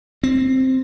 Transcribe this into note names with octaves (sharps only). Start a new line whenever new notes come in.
C4